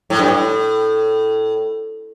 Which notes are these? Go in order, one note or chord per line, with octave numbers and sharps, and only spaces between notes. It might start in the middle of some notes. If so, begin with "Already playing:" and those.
A2
G2
A2